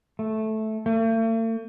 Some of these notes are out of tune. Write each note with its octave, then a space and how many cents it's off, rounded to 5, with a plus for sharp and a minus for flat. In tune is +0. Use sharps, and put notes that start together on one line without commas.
A3 -10
A3 +45